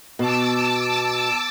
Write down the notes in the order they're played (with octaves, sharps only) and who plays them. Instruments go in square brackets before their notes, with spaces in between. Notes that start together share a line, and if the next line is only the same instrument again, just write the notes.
[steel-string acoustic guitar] B2 [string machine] A5 D6 E6